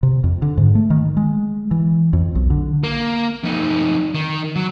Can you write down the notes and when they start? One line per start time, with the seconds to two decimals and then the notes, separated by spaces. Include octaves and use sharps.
0.03 C3
0.24 F2
0.42 D3
0.58 G#2
0.75 A3
0.90 D#3
1.17 G#3
1.71 E3
2.13 F2
2.35 B1
2.50 D3
2.84 A#3
3.43 F2 D#4
4.14 D#3
4.56 F#3